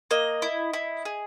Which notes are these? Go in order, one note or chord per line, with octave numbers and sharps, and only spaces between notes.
A#3 D#5
E4
E4
G#4